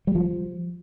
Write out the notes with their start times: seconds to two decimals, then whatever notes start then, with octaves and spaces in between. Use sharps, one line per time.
0.07 G3
0.15 F3